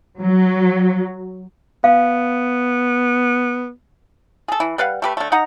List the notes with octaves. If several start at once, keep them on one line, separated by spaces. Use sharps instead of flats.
F#3
B3 F5
G#4 A4
E3
G3 B4 F5 F#5
A3 G4 B4
D3 A3
D#4 D#5 F#5 A#5